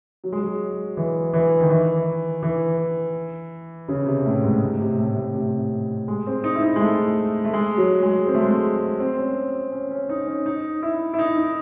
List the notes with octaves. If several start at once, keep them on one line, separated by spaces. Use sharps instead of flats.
F#3
G#3
F#3
E3
E3
D#3
E3
E3
C#3
C3
A2
G#2
A2
C3
A2
A2
C3
G#3
C4
D#4
E4
D#4
G#3
A3
A3
G#3
F#3
G#3
C4
A3
G#3
A3
C4
C#4
C#4
C#4
D#4
C#4
D#4
E4
E4
D#4
D#4